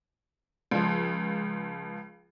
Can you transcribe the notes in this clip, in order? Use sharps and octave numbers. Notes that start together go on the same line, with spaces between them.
C#2 F3